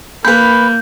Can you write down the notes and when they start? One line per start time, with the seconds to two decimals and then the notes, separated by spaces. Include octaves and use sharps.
0.25 A#3 B4 B5 G6